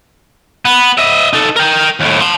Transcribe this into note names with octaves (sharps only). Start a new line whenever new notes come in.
B3
D#5 E5
D#4 A4
A#4 G5
D#2 A2
A5 C6